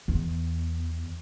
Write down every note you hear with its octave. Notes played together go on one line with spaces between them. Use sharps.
E2